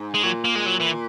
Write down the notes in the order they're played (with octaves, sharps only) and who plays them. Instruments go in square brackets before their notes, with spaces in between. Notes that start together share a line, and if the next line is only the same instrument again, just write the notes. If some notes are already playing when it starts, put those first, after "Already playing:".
Already playing: [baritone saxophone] G#2
[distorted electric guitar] G#3
[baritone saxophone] A#2 [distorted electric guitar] F#3
[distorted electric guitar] A#3
G#3
F#3
E3